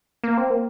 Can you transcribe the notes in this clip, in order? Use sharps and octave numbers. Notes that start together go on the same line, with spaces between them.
A#3
C4
A#3